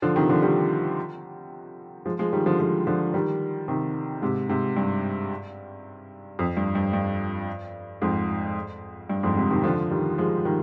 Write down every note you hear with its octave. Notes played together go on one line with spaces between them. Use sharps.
D3 F3
C3 D#3
D3 F3
D#3 G3
F3 G#3
F3 G#3
D#3 G3
D3 F3
F3 G#3
D3 F3
D#3 G3
C3 D#3
G#2 C3
G#2 C3
G2
F2
G2
G2
G2
F2 G#2
G2
F2 G#2
G#2 C3
C3 D#3
D3 F3
D#3 G3
F3 G#3
D#3 G3